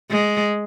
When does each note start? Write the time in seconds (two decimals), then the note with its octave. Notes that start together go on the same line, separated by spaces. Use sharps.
0.11 G#3